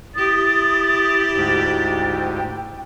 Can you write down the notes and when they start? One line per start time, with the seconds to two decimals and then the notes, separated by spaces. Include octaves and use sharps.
0.15 E4 G4 D#6 A6
1.36 D2 G#2 G5